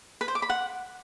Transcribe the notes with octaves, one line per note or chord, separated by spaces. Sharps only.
B4
C5
D6
B5
F#5